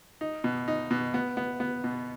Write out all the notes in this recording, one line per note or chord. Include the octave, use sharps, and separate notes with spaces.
D#4
B2
D#4
B2
B3
B3
B3
B2